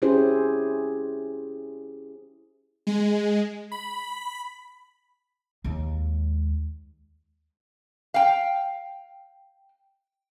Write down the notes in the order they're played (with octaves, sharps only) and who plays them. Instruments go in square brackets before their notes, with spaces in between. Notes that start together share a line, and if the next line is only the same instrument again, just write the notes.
[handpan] C#4 E4 G4 G#4 C5
[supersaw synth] G#3
B5
[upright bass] D#2 G#3
[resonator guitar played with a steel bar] F5 G5